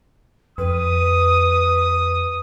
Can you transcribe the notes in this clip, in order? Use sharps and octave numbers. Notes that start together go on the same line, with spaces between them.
F2 B4 D#6